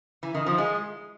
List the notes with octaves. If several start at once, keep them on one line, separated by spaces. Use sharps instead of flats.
E3
D#3
F3
G#3